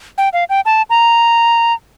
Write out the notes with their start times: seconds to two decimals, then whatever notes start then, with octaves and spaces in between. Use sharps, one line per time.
0.18 G5
0.33 F5
0.50 G5
0.66 A5
0.90 A#5